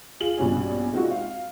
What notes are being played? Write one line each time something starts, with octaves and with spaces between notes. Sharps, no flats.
F4 G#4 F#7
A#1 G2 B2 C#4 G#5
G#3 C4 D#4 F4 F#4
F5